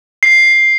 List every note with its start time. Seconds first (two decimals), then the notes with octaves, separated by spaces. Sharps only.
0.23 C7